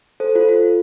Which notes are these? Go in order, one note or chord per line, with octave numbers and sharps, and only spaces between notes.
A4 C5
F4 A4
F4